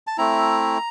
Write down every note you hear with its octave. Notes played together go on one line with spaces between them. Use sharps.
A5
A3 C4 E4 A#5